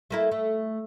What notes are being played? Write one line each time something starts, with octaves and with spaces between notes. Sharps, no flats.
A3 A#3 E4
A3